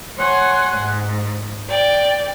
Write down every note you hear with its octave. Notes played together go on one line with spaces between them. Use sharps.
C#5 F#5 G#5 C6
G#2
D5 G5